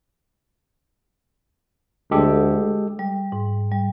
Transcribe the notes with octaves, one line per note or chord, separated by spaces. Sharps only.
D2 G#3 G4 A4
G3
G#2
G3